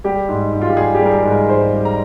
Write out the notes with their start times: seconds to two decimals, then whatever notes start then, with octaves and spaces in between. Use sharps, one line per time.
0.04 G3 G4
0.29 G#2
0.53 G#2
0.62 F4
0.70 G4
0.77 G3 G#4
0.95 G4
1.01 G3 A#4
1.12 G#4
1.24 G#2
1.31 A#4
1.49 G#2 C5
1.73 G3
1.85 A#5